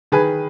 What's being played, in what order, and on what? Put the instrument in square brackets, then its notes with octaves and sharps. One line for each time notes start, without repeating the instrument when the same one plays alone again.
[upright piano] D#3 G#4 B4